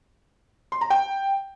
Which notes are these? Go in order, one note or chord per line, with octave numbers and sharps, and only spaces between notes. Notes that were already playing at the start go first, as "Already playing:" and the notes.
C6
A#5
G5